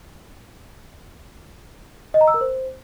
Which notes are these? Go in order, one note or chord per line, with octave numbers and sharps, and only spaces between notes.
D#5
A#5
E6
A#4
C5